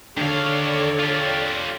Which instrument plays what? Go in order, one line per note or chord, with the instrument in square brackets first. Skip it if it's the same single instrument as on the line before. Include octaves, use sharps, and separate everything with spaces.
[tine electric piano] D3 D4 [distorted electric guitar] D#3 F5 [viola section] A4 C#5 D5
[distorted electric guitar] F4 G4